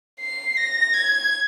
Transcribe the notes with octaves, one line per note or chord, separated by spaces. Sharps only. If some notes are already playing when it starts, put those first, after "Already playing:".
C7
A#6
G#6